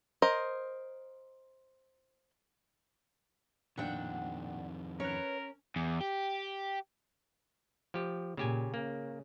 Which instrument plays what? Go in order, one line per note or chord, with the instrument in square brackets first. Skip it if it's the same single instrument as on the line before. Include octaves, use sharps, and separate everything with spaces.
[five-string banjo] A#4 C5 D#5
[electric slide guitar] F2 D#3 [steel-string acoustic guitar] A#2 G5 [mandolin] D4 F#5
[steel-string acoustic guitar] C#4 [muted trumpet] A#4 [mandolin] B4 C#5
[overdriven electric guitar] E2
G4
[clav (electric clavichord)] F3 G4
[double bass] A#2 [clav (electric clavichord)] C#3 G4 G#5
[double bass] C#3 [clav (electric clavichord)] A#3